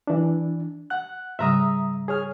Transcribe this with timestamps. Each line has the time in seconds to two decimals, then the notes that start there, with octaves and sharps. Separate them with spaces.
0.07 E3 D4
0.90 F#5 F#6
1.39 G#2 C#3 G3 E5 A#5 D#6
2.08 G#4 C#5 F6